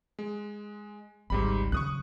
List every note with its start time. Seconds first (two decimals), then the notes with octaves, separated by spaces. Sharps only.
0.19 G#3
1.30 G#1 C#2 G#2 G3 B5
1.72 C#3 F#3 C#6 D#6 F#6